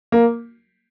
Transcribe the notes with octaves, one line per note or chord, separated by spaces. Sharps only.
A#3